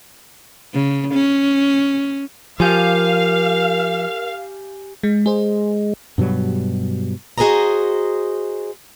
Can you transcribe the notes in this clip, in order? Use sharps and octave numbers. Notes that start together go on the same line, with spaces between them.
C#3
C#4
F3 G4 A#4 F5 G#5 G6
G#3
G#3 G#4 C5
G2 B2 F#3 G3
F#4 G#4 B4 C5 D#5 A#5